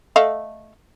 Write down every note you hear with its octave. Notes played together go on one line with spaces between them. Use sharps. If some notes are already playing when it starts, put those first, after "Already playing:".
A3 D#5 F5